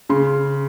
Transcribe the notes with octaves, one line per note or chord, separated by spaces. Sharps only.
C#3 C6